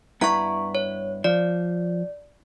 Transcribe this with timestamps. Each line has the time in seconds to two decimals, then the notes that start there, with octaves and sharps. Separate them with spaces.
0.21 G2 B3 E4 A#5 C#6
0.75 C#5
1.24 F3 D5